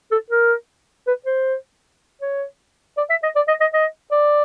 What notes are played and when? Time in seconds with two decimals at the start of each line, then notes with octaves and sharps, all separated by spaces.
0.11 A4
0.30 A#4
1.07 B4
1.26 C5
2.21 C#5
2.97 D5
3.10 E5
3.23 D#5
3.36 D5
3.48 D#5
3.61 D#5
3.73 D#5
4.12 D5